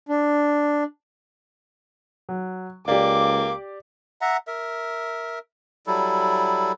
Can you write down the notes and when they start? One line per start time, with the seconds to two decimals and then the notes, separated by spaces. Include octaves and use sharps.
0.09 D4
2.29 F#3
2.88 C#2 A#3 G4 D5 D6
4.21 E5 F#5 A#5
4.47 A#4 E5
5.87 F#3 G3 E4 A4